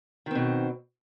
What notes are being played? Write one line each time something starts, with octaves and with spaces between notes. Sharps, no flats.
B2 D#3 C4